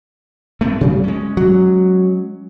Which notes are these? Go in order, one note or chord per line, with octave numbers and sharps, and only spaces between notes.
A3 B3 C4
C3 F#3 G3
G#3 C#4
F#3